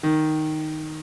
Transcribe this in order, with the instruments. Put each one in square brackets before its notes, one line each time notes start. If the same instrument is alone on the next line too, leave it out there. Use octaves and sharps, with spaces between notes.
[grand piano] D#3